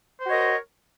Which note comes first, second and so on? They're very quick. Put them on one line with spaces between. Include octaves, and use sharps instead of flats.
C5 F#4 C#5 D#5 A#4